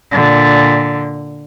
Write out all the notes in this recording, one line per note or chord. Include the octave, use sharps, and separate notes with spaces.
A#2 D3